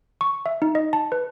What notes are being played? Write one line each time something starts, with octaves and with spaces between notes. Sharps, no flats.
C#6
E5
D#4
D#5
A5
B4